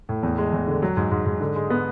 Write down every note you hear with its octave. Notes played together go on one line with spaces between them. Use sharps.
A2
E2
G#3
E2
D3
F#3
G#2
G#2
G#2
D3
G#3
B3